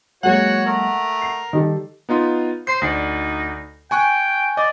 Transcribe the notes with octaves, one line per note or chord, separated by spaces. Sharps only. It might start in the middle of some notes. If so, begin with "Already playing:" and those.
F#3 G#3 A#3 F#4 C#5 F#5
A3 A#4
C7
D#3 G3 G4 A4
B3 D#4 F4
C5 C7
D2 D#4 D5
G5 G#5 C#6 F#6
D5 D#5